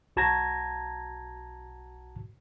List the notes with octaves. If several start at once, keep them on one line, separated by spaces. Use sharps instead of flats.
B1 F#4 A5 A#5 G#6 A#6